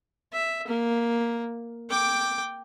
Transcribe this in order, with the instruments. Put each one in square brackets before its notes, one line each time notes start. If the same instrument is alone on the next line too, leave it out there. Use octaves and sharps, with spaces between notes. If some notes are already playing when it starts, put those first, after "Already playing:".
[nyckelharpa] E5
A#3
G5 D6